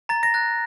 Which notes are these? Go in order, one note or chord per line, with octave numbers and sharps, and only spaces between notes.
A#5 A6
A#6
F#6 A6